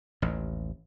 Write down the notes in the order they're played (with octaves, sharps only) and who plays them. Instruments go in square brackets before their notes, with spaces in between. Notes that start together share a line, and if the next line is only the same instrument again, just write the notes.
[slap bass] A1 D#2